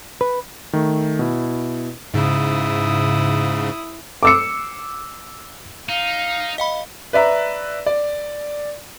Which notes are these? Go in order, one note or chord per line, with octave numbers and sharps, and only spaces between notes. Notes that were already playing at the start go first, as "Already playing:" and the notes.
B4
D#3 A3
B2 E4
G#2 C#3 E4 D#6
D6 E6 C#7
D#4 F5
D#5 F5 B5
B4 D5 E5 A#5
D5